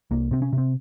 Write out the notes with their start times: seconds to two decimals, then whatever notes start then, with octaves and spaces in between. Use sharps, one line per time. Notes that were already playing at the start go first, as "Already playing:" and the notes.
0.11 C2 A#3
0.31 C3 C4
0.42 C#4
0.53 C3
0.58 C4